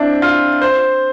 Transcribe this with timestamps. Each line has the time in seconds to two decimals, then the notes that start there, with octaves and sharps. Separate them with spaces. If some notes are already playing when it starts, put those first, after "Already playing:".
Already playing: C4 D4 E4
0.22 F4
0.62 C5